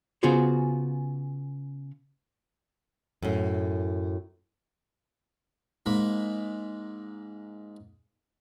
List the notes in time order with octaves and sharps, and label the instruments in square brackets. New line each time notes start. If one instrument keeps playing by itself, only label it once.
[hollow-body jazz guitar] C#3 B3 F4 F#4 G#4 C5
[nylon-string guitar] F#2 A2
[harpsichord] G#2 G#3 A#3 B5